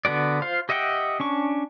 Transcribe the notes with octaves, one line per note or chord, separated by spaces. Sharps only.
D3 B3 F#4 D5
F4 C5 F5
G4 D#5 E5 F#5 G5
C#4 D4 C#6